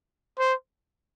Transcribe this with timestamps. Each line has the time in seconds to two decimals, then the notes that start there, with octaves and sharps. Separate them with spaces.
0.39 C5